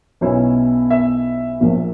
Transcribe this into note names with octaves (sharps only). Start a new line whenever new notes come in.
B1 B2 F#3 C#4 E4
E5
A#1 A#2 F#3